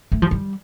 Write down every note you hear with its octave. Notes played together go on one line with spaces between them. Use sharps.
A3
F3
G3